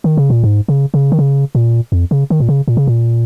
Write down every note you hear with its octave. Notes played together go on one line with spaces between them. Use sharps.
D#3
C#3
A#2
G#2
C#3
C#3
D#3
C#3
A#2
F2
C#3
D#3
A#2
C#3
A#2
C#3
A#2